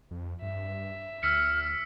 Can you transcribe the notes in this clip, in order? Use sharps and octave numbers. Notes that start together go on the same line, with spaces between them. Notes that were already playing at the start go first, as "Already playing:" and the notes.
F2
G2 E5
D2 E6 F6 B6 C#7